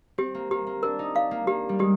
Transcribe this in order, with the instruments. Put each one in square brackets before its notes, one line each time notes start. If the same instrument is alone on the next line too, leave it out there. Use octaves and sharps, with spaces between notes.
[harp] C4 [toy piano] G4
[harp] A#3
[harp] A#3 [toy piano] G4
[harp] A#3
[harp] D4 [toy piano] A#4
[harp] D#4
[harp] D4 [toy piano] F5
[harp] A#3
[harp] A#3 [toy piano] G4
[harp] G3
[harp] G#3 [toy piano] G4